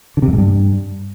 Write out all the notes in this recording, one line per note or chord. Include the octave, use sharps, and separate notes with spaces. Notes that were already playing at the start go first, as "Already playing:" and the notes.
D3
C3
F2
G#2
G2